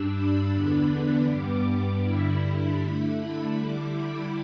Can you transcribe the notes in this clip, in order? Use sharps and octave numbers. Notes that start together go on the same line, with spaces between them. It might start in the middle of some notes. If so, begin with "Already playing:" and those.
Already playing: G2 G3 D4 E6
B5
E2 D3 B3 D4
G2 G3 B3 D6
D6
G2 D3 G3 E4 B5
D3 A3 E4 B5
D3 G3 E4 D6
B5